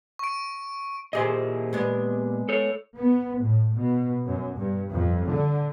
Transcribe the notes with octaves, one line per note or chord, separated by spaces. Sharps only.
C#6 D7
A#2 E4 G4 G#4 C5 D#5
G#3 B3 D4
A4 C#5
B3
A2
B2
F#2
G2
F2
D3